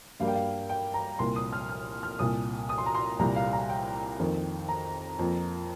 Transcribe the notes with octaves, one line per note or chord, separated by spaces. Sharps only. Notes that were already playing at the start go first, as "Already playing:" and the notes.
G2 G3 A#3 F5
G5
F5
G5
A#5
C2 A#2 A#3 C6
D#6
F6
F6
F6
C2 A#2 A#3 D#6
D#6
C6
A#5
C6
C2 A#2 G3 A#5
F5
A#5
G5
F2 D#3 A#3
A#5
F2 F3 A#3